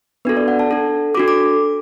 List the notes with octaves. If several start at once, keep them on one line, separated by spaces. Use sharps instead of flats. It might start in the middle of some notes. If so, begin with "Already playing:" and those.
B3 D4 F#4 A4 B4
D5
F#5
A5
D4 A4
D4 F#4 A4 D6
D6